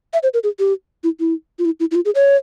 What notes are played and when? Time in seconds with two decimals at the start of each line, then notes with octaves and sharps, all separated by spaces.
0.13 E5
0.23 C5
0.34 A#4
0.44 G#4
0.59 G4
1.04 E4
1.20 E4
1.59 F4
1.65 E4
1.80 E4
1.91 E4
1.95 F4
2.05 G#4
2.15 C#5